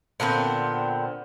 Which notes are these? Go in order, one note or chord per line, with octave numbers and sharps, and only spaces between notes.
A#2 D3 B3 C4